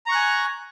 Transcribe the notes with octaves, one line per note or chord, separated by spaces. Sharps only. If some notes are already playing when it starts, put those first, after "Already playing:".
G#5 A#5 C#6 F#6